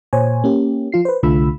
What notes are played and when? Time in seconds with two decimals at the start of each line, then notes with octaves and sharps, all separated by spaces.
0.13 A#2 C5 C#5 G#5
0.44 A#3 C#4 G4
0.92 F3 F4 C7
1.05 B4 C5
1.23 C2 D3 A3 F4 B5 E6